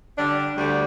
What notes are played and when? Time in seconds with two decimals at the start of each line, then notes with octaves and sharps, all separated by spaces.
0.17 D3 G3 D4
0.56 D2 D3 G3